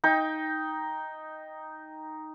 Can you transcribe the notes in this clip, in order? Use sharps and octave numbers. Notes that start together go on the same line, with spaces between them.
D#4 G5